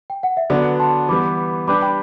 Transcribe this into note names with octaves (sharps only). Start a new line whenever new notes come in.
G5
F#5
E5
D3 F#3 B3 D4 B4 D5
A5 C6
E3 G3 B3 B5 D6
G3 D4 G4 B4 B5 D6
G5 B5